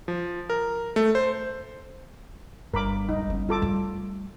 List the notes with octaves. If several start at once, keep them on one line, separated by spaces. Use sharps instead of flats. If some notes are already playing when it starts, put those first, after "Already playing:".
F3
A#4
A3
C5
G1 G2 A#4 B5 D6
D#1 G#3 D#4
B3 C#4
F4 A4 D6
G3 A3